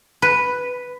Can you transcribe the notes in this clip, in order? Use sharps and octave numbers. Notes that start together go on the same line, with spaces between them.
B4